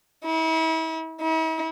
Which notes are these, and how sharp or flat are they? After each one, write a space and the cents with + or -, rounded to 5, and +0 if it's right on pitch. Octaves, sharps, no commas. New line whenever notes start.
E4 -40
E4 -45